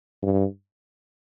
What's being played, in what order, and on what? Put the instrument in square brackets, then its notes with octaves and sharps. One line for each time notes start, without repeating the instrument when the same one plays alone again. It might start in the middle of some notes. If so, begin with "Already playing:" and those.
[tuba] G2